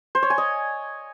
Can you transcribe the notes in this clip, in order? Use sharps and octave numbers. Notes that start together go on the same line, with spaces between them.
C5
C#5
G#5
D#5